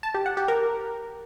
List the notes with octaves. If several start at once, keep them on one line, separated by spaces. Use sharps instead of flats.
A5
G4
F#5
G4
A#4